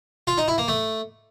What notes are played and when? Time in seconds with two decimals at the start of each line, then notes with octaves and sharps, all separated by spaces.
0.27 F4
0.38 D#4
0.48 E4
0.58 A#3
0.68 A3